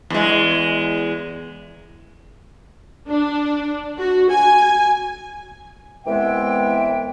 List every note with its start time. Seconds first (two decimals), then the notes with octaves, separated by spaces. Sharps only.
0.10 E2 G#3
3.08 D4
3.98 F#4
4.30 G#5
6.05 C2 E3 G#3 B3 E5 G5